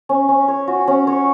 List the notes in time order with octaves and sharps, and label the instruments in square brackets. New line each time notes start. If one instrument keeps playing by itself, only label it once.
[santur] C#4
C#4
C#5
F#4
C#4
C#5